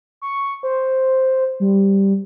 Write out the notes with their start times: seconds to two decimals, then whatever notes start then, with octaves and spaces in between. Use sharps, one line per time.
0.22 C#6
0.63 C5
1.60 G3